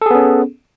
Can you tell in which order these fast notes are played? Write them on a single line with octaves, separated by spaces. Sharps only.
A4 G#4 B3 C#4